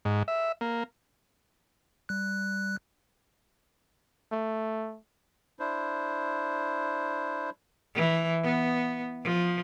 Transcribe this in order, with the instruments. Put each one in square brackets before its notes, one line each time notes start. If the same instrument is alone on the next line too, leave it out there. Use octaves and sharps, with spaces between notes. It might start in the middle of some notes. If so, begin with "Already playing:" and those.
[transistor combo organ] G#2
E5
A#3
[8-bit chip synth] G3 F#6
[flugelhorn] A3
[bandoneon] D4 E4 C5
[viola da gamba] E3
B3
F3